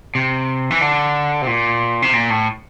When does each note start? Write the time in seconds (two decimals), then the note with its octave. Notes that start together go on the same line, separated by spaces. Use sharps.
0.15 C3
0.71 E3
0.81 D3
1.42 C3
1.47 A#2
2.02 C3
2.13 A#2
2.30 A2